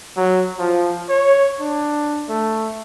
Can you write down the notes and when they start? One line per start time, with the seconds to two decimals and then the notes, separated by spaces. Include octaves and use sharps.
0.17 F#3
0.59 F3
1.10 C#5
1.60 D4
2.29 A3